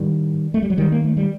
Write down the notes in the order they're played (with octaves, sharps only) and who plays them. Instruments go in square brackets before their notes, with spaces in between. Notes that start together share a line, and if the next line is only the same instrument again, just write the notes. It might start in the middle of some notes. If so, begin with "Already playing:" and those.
Already playing: [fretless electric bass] A2 D#3 G3
A3
G3
F#3
D#3 G3
A#3
A3
G3